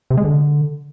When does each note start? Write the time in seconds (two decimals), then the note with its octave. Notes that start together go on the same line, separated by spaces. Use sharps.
0.11 C3
0.17 G#3
0.24 D3